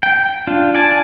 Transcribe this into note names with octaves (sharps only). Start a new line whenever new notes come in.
G5
D4 F4
D5 G#5 A5